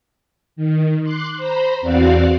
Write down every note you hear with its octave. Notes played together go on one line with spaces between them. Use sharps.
D#3
C6 D6 F#6 C7
C5 A#5 B5
E2 C4 F#4 D5 F5 F#6